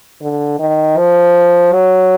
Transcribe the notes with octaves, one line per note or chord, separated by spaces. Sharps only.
D3
D#3
F3
F#3